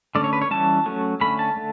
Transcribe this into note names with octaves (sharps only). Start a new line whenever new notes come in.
D3 A3 C#4 D5
C#5
B4
C#5
E3 G3 C#4 A5
F#3 A3 C#4
D3 A3 C#4 B5
A5
D3 A3